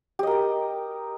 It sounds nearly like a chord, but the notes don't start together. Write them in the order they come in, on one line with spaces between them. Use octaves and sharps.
G4 D#5 A#4 G5